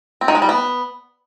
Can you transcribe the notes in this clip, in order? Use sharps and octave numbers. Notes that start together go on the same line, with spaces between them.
C4
D#3
G#3
G3
B3